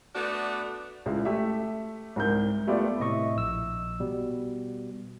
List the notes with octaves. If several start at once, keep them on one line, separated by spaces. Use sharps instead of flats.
A3 B3 D4 F#4 D5
C#2 G#3 E4 E5
A3 G4 E5
C2 G#2 A#4 G6
G3 A3 B3 F4 D5 E5
A2 C3 D#5 E5 C#6
A#1 E6
B2 G3